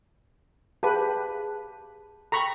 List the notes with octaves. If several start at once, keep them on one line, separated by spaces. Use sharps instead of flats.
G4 G#4 B4 F5 A5
A4 G5 A#5 B5 C#6